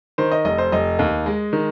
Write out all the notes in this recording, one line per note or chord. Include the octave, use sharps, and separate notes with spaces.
D#3 C5
D#5
F1 D#5
C5
F1 D#5
D#2
G#3
D#3